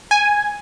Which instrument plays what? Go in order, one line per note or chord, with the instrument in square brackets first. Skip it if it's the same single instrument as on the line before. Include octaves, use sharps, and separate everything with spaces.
[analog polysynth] G#5